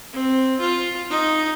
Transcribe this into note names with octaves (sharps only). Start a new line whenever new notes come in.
C4
F4
D#4